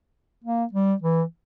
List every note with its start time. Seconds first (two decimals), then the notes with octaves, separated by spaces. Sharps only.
0.44 A#3
0.72 G3
1.02 E3